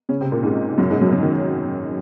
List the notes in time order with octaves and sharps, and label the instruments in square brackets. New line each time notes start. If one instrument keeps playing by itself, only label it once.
[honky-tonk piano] C#3 C#4
C3 C4
A#2 A#3
G#2 G#3
F#2 F#3
G#2 G#3
F#2 F#3
F#2 F#3
D#3